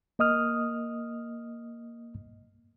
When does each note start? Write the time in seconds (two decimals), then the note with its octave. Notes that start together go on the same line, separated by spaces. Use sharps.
0.19 A#3 D#5 D#6 F6